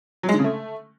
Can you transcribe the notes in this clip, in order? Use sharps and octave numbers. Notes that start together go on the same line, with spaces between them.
F#3
G#3
D3
C#3
A3